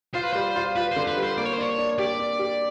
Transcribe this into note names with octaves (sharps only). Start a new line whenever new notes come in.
F4 C5
B4
G3 C5
F4
F4 B4
D3 C5
B4
G3
C5
A#3 D5
C#5
C5
D4 C#5
D4
G4 D5
D4
G4